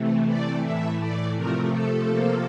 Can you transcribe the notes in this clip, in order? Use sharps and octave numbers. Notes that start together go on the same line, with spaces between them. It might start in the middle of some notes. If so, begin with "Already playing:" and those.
Already playing: C3 E3 A3
D5
A2 E3 A3 E5
D5
C3 F3 A3 A#4
A4
C3 F3 A#3